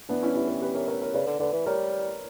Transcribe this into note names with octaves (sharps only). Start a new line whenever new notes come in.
E3 B3 D4
C#4 E4
E4 G4
G4 B4
G4 B4
A#4 C#5
A#4 C#5
A#4 C#5
C#3 B4 D5
D3
D3 B4 D5
E3
G3 A#4 C#5